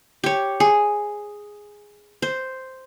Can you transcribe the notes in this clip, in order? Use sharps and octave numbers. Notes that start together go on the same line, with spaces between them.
G4 C#5
G#4
C5